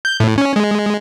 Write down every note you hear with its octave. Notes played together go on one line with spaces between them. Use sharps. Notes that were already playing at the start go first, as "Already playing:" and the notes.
G6
A2
C#4
G#3